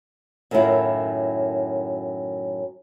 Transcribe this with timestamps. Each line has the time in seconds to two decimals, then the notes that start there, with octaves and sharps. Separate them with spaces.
0.51 F#2 A2 D#3 F#3 E4 F4